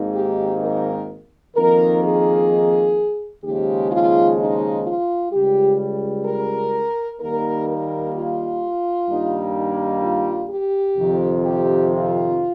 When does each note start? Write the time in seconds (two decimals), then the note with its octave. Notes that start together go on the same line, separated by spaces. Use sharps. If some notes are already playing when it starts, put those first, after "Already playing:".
Already playing: G#1 G#2 D#3 A#3 D#4
0.15 G4
0.62 A#4
1.56 F2 D#3 A#3 D#4 A#4
2.03 G#4
3.44 D#2 C#3 F3 G#3 G4
3.92 F4
4.38 D#4
4.86 F4
5.32 C#2 C#3 G3 G4
6.26 A#4
7.21 D#2 D#3 G3 A#3 D#4 A#4
7.69 A#4
8.14 F4
9.09 G2 D#3 G3 A#3 D#4
9.56 D#4
10.03 F4
10.50 G4
10.97 F2 C3 D#3
11.43 G4
11.91 F4